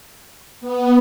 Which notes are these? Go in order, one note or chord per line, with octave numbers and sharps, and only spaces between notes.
B3